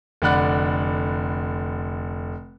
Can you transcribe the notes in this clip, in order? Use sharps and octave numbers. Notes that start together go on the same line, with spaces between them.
F1 D3 D5 F#5 B5 F#6